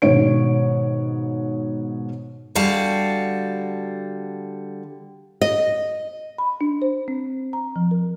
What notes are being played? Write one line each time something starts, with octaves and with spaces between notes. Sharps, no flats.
G#2 B2 D#3 C#5 D7
D3 G3 F#4 F5 A5
D#5
B5
D4
C5
C4
A#5
F3
A#4